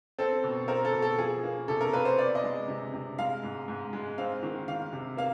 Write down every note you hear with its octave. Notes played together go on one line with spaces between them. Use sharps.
C4 A4
B2
C4 A#4
A4
B2
A4
F3 G#4
A#3
C3 A4
A#4
A#3 B4
C5
B3 D5
D#5
G#3
C3
C3
G#3 F5
G#2
G#2
G#3
C4 F5
D#3
D#3 F5
C3
A#3 F5